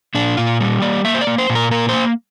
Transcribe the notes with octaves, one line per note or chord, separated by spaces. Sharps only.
A#2 D4
A#2 F4
G3
A#3 D5
A#3 E5
C5
D5
A#3
C5
A#2
A#4
A#3 A#4
A#3 C5